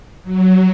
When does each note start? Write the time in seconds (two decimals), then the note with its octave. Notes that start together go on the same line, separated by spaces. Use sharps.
0.23 F#3